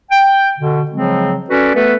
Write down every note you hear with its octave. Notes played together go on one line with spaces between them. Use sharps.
G5
B2 D3
C#3 F3 F#3 G#3 C4
C#4 F#4 A4 B4 D5
A3 B3 A4 B4